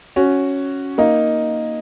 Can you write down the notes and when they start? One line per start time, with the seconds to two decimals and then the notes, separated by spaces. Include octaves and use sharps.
0.16 C#4 F#4
0.98 A#3 D#4